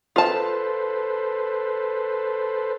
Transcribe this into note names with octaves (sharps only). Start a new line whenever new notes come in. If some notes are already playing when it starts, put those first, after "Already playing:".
F4 A4 B4 C5 A5